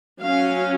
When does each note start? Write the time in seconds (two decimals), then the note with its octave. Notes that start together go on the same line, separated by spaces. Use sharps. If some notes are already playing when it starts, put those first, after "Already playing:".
0.22 F#3 C#4 F5